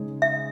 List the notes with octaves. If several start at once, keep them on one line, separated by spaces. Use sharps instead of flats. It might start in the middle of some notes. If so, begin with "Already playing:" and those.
Already playing: C#3 G#3 D#4 G#4
E5